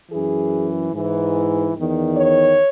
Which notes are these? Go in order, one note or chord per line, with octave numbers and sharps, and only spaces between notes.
E3 G#4
F#2
G#2 E3
E2 D#3
C#5